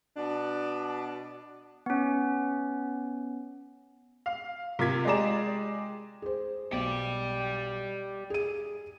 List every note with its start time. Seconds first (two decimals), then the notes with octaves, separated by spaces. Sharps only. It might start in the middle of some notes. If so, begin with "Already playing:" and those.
0.17 B2 D4
1.86 B3 C#4
4.26 F5
4.79 C3 F4 A#4 G#6 B6
5.05 G#3 G4 G#4 D5 A#5 E7
6.22 G#4 C5
6.72 B1 G4 D5
8.30 G#4 D#7